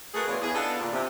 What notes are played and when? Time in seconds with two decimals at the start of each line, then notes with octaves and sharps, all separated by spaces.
0.14 A3 F#4 G#4 A#4 B4
0.27 B2 E3 F#3 D4 F4
0.42 E2 G#4
0.54 B3 D4 D#4 F4 G#4 A4
0.79 A#2 D3
0.92 C3